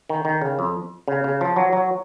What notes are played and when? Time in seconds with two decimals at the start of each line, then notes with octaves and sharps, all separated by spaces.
0.10 D#3
0.25 D#3
0.42 C#3
0.59 F2
1.08 C#3
1.24 C#3
1.41 F3
1.56 F#3
1.73 F#3